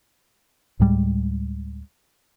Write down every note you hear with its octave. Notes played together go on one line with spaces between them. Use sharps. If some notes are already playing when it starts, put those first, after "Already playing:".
D2 A2 G3 G#3